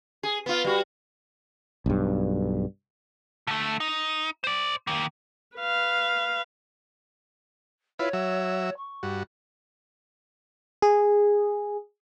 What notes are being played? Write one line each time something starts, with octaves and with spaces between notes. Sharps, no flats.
G#4
B3 F4
G3 F#4
B1 G2
D3 A3
D#4
C5 D5
D#3 A#3
B4 F5
E4 F4 B4 C#5
F#3 E5
C#6
G2 F#4
G#4